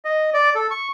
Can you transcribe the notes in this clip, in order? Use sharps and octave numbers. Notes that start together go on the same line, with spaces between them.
D#5
D5
A4
C#6